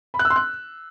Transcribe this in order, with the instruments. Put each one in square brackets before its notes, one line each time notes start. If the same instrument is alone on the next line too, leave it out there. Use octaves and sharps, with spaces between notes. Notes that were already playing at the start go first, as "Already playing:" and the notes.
[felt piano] B5
F#6
E6
C6
F#6